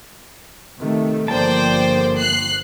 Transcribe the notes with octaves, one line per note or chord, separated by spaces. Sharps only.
C3 D#3 A3
G1 D3 F3 A#3 C5 D5 G5 A5
F#6 C7